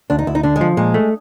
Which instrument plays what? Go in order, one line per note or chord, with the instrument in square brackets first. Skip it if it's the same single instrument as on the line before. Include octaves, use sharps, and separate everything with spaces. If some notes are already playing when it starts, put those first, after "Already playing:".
[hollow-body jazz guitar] D2 [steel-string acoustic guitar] D4
[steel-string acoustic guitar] D#4
[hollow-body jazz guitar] D2 [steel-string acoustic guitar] E4
[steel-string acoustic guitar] D#4
[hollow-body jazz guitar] D3 [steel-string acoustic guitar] D4
[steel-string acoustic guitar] G#3
[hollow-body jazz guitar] F3
[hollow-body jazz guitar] A#2 [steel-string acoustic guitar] G#3
[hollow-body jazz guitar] A3